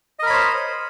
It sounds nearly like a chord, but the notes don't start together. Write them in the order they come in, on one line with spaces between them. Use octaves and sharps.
D#5 A#4 B5 C#5 C5